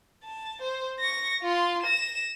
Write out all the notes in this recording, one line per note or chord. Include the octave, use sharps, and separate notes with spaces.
A5
C5
C#6 A#6
F4 C6
A#6 E7